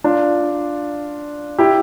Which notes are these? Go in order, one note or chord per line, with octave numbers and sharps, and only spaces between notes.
D4 F4
E4 G4